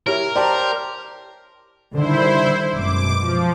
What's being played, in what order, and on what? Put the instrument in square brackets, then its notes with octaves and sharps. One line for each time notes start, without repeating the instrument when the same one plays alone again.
[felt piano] E4 G4 C#5 [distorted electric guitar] A#4
[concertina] G4 C5 [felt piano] D5 A5 A#5
[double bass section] D3 D#3 G3 [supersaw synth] E4 C5
[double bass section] G#1 F#2 B2 [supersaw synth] D6
[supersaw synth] F3